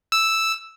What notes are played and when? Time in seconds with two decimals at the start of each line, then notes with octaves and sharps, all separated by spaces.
0.12 E6